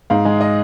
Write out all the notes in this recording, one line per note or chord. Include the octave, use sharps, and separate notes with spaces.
G#2 F5
G#3
D#5